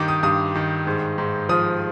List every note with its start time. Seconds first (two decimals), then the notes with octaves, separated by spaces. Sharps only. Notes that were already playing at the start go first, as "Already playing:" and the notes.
Already playing: G2 D#3 D6
0.08 D#6
0.23 G2 D#6
0.55 D#3
0.87 G#2
1.18 G#2
1.49 F3 D#6